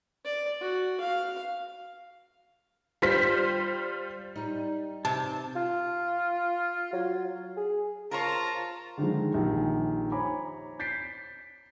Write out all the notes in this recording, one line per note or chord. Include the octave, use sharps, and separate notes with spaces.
D5
F#4
F5
G3 F4 C5 B6
G3 D#4
C3 A5
F4
F#3
G#4
F4 A#4 C5 C#5 A5 A#5
D3 D#3 F3 G#3
A#1 D#3 G3
C5 C#5 G#5 A#5 B5 D6
G6 A6 B6 C7 D7